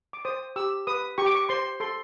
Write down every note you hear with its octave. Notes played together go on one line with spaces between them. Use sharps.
D6
C5 D#6
G4 E6
B4 D#6
G4 C#6
D6
C#6
C5 C6
A4 C6